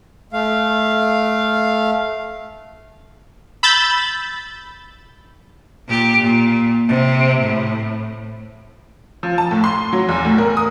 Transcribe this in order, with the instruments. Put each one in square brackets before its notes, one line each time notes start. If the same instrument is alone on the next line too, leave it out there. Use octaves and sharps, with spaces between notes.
[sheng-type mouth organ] A3 F5
[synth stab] B5 E6 G6 A6
[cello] A#2 G4
A#2
C3
A2
[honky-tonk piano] F3
A5
A2
C6
F#3
E2
A2
A#4
D#6